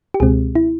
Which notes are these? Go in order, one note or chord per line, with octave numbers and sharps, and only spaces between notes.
G4
C#2 B2 G#3 C4 G#4
E4